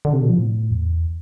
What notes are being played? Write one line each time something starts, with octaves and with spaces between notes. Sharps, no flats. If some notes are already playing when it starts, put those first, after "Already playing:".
D3
C3
B2
F3
A2
E2